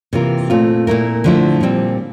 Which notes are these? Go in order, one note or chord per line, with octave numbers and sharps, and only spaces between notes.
C3 E3 A#3 F4 A#4
A#2 A3 C4 F4
A#2 A3 E4 A#4
D3 F3 A3 E4
A#2 G3 C4